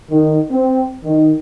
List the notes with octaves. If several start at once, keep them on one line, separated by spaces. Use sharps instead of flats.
D#3
C4
D#3